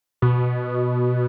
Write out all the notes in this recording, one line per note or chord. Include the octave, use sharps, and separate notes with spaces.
B2